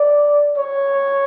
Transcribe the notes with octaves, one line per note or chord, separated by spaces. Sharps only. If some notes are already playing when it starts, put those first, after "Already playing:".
Already playing: D5
C#5